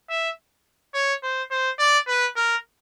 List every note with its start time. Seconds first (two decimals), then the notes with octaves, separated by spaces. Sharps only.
0.10 E5
0.95 C#5
1.23 C5
1.51 C5
1.79 D5
2.08 B4
2.36 A#4